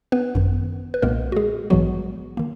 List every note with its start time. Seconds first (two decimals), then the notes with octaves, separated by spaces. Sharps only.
0.12 B3 B4
0.35 G#1 F#2 D#3
0.94 B4
1.02 B1 A#2 G#3 A#3 B3 A#4
1.32 F#4
1.36 G#3 G#4
1.70 A#1 G#2 E3 F#3 G#3 B3 F#4
2.37 D#3 A#3